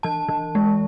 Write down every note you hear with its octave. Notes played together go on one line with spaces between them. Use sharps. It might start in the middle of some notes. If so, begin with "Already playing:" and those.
E3 A5
E3
G#3